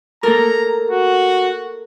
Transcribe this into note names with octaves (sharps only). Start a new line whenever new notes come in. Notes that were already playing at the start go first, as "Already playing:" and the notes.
A#3 A4 A#4 A#5
F#4